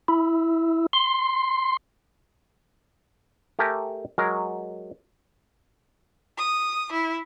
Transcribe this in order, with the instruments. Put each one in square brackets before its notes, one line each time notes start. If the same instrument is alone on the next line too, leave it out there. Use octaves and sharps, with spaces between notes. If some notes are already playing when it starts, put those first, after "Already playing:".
[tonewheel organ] E4
C6
[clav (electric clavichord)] A3 G4 A#4 G#5 A5
F#3 G#3 A#4
[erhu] D#6
E4